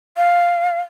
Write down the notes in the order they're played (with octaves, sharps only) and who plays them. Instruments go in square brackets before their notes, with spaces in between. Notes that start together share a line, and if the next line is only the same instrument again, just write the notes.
[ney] F5